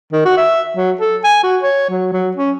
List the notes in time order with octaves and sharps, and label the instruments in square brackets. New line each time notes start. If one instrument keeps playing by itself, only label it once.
[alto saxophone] D#3
F#4
E5
F#3
A4
G#5
F#4
C#5
F#3
F#3
C#4